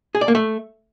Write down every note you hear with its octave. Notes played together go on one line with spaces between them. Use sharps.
G#4
D5
A#3
A3